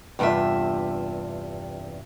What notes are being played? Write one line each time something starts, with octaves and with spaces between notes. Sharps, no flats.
E2 G2 C3 F4 E5